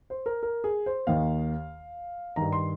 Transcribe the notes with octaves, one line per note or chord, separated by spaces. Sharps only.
C5
A#4
A#4
G#4
C5
D#2 D#3 F5
G2 D#3 A#5
C6